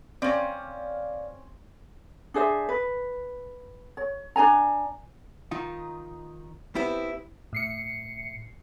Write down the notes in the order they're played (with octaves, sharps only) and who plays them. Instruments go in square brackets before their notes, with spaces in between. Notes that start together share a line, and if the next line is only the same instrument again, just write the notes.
[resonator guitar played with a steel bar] C4 C#4 [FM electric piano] D5 F5
[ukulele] D4 G#4 C5 E5
B4
C#5
D4 A#4 G#5 A#5
[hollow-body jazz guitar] D#3 D#4 F4
B3 C4 E4 G4
[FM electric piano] A2 C7 C#7